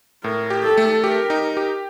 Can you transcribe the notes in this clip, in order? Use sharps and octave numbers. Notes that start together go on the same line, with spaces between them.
A2 A#4
G4
A4
A3
G4 A#4
D#4
G4